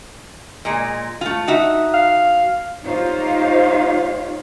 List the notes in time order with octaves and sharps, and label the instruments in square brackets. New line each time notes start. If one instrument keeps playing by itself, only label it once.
[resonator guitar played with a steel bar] A#2 G#3
A3 F4
D#4 F#4 E5
[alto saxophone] F5
[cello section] D#4 F4 G4 C5 C#5 F5